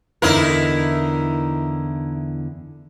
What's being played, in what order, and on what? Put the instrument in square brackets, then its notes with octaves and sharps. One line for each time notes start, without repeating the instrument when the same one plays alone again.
[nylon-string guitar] E2 D3 [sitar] D#4 E4 A#4